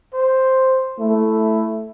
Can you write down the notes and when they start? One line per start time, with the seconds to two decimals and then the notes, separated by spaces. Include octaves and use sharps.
0.13 C5
0.99 A3 E4